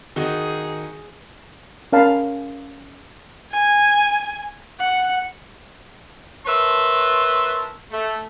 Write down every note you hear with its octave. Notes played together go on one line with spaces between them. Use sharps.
D#3 D#4 F#4 G#4
C#4 A#4 F5 A5 B5
G#5
F#5
A#4 B4 C#5 E5 A5 C6
A3